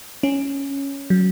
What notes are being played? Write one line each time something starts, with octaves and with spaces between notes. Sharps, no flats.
C#4
F#3